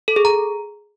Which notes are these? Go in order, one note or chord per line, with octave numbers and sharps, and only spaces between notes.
A4
G#4
A#5